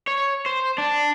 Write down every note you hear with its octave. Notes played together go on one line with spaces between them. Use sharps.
C#5
C5
D4